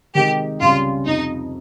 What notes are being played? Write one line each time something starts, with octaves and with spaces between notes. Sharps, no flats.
C3 D#3 G#3 D#4 G4 A#4
C#2 C3 G3 C#4 F4
F2 C3 F3 D#4